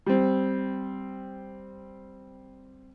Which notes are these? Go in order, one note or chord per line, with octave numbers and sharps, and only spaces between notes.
G3 C4